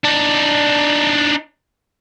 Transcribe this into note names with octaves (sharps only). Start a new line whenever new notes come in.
D4 D#4